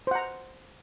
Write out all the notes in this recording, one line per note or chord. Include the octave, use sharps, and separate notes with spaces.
C5 F#5 A#5